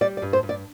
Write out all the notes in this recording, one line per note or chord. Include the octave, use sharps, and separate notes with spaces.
G3 D5
D5
G2
C5
G2
D5